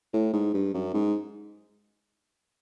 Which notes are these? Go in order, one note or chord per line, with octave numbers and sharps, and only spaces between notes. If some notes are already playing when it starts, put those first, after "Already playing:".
A2
G#2
G2
F#2
G#2